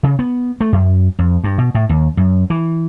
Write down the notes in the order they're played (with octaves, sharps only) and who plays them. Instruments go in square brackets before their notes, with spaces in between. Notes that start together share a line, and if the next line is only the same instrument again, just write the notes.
[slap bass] C#3
B3
A3
F#2
F2
G2
B2
A2
D#2
F#2
E3